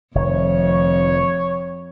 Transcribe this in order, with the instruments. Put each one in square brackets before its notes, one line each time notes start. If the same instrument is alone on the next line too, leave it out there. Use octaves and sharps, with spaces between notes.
[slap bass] F1 D#3 [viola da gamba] F2 [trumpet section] C#5